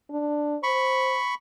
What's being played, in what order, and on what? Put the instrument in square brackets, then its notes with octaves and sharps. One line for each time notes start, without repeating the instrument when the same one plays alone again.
[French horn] D4
[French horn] C5 [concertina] B5 C#6